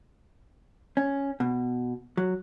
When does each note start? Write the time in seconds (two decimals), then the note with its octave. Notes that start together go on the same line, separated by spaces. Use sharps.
0.97 C#4
1.40 B2
2.17 F#3